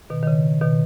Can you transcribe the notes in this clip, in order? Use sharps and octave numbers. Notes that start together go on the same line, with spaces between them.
B2 D#3
D#3
C#3
B2 D#3